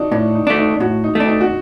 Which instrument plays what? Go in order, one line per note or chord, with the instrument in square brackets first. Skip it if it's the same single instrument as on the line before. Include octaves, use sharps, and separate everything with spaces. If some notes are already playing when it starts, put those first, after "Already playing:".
Already playing: [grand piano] D4 D#4 F#4
[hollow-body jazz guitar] A2 [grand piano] D4
[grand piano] D#4
[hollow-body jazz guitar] A3 D4
[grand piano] D#4
[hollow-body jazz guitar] A2 [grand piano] F#4
[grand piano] D#4
[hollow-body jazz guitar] A3 D4
[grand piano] D#4
F#4